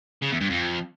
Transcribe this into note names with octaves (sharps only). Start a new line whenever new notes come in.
C#3
E2
G2
F2